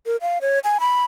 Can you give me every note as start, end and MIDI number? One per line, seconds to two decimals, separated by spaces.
0.06 0.16 70
0.21 0.38 77
0.42 0.59 73
0.64 0.78 80
0.80 1.05 83